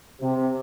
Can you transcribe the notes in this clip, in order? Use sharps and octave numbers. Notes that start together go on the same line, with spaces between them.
C3